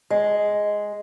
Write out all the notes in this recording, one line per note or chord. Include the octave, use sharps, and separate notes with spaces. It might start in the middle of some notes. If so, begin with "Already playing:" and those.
G#3